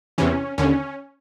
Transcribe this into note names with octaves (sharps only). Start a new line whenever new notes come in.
E2 C3 E3 C#4
D#2 D3 C#4